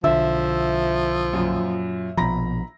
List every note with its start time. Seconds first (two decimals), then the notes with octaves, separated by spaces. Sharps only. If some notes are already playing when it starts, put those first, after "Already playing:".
0.04 B1 D3 F3 E5
1.33 F#2 A#2
2.17 A#1 B2 F3 A#5 B5 A#6